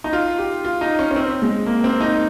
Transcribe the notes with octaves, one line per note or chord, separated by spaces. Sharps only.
D#4
F4
G4
F4
D#4
C#4
C#4
C4
G#3
A#3
C4
D#4